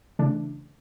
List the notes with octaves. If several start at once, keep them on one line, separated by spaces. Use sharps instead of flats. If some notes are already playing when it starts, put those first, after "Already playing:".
C#3 E3 A3 D4